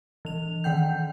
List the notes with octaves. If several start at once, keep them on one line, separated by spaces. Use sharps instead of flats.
E3 F7
D#3 F#5 G5 G6